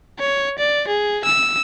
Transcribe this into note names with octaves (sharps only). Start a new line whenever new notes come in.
C#5
D5
G#4
E6